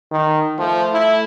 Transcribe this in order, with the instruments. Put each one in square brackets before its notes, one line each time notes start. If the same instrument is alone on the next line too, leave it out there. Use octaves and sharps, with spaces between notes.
[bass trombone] D#3
[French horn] F3 [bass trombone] A3
[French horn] E4